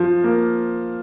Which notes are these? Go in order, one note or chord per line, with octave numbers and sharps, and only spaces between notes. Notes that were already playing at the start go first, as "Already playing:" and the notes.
Already playing: F3 F4
A#3